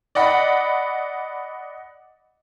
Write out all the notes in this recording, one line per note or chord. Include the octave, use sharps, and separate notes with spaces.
D5 D#5 F#5 B5